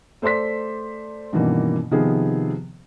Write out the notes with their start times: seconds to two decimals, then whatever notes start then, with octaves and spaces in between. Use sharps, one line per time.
0.22 A3 C5 D5 C6 B6
1.33 G2 B2 D#3 E3 A#3 C#4
1.91 C3 D#3 F3 B3 G#4